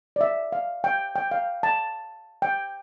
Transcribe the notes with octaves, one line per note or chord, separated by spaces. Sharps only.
D5
E5
F5
G5
G5
F5
A5
G5